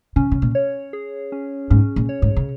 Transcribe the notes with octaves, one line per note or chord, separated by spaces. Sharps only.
C#3 C#4
C#3
A#2
C#5
G#4
C#4
G#2 C#4
A#2
C#5
G#2
C#3